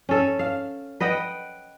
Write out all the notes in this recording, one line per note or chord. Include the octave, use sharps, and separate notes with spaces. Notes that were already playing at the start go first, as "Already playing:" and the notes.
C#4 A4
F5
B4 D#5 F#5 G5